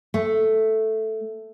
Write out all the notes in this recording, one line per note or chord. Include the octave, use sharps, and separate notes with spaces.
A3